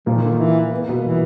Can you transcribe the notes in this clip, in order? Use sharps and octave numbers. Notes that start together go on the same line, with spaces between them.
A#2 F3 A#3
D#3
D3
D#3
E3
B3
A#3
B2 B3
E3